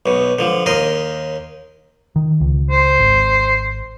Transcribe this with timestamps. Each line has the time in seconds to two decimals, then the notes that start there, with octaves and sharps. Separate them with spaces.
0.06 B1 B2
0.39 D3 F3
0.66 D#2 A#4 D#5 C6
2.16 D#3
2.41 C#2
2.70 C5
2.99 G#1